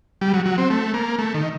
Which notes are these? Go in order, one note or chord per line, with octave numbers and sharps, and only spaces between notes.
G3
F#3
F#3
C4
A3
A#3
A3
D#3